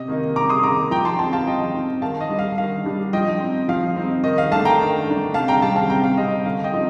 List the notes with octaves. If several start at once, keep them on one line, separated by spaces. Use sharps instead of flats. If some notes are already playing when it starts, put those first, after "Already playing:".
Already playing: C3 D#5
D#3 A#3 D#4
C3 A#5 D6
C6 D#6
D#3 A#3 D#4 A#5 D6
F3 G5 A#5
A5 C6
C4 D#4 A5 C6
F5 A5
F3 D#5 G5
C4 D#4
D#3 F5 A5
D#5
G3 D4
F5
D#3 F5
G3 D4
F3 D#5 G5
C4 D#4
F3 F5
C4 D#4
D#3 D#5
F5
A3 D4 F5 A5
G5 A#5
D#3
A3 D4
C3 F5 A5
G5 A#5
G3 C4 F5 A5
F5 A5
C3 G5 A#5
F5
G3 C4 D#5
D3 F5
D#5 G5
F3 C4 D#4